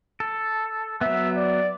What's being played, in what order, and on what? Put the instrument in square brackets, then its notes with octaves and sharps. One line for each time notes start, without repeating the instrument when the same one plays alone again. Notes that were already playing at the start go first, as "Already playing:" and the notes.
[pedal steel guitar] A4
[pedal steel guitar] F#3 B3 [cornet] E5
[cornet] D5